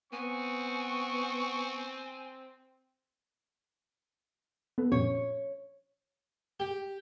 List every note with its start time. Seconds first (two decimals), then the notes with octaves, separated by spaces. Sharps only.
0.13 B3 C4 G#5 C#6
4.78 B3 A4 B4
4.92 A#2 F3 C#4 C#5
6.60 G4